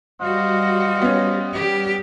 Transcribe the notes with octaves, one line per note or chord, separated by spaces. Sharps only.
G3 F#4 C5 D#5 F5
B3 C#4
G4